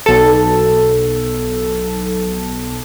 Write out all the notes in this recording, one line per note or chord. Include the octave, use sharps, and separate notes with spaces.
B1 A4